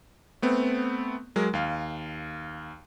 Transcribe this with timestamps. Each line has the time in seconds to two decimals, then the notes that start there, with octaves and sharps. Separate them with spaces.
0.42 A3 B3 C4
1.36 F#3 G#3 A#4
1.53 D#2 F5